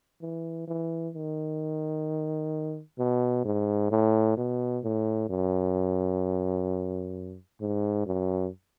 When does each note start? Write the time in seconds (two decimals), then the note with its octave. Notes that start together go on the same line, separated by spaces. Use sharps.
0.22 E3
0.68 E3
1.15 D#3
2.99 B2
3.45 G#2
3.91 A2
4.37 B2
4.84 A2
5.30 F#2
7.61 G#2
8.06 F#2